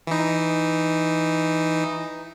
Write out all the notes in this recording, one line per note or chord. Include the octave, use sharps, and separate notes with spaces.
E3 D#4